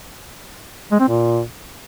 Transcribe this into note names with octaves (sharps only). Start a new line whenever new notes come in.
G#3
C4
A#2